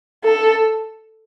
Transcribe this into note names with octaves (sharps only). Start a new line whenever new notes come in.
A4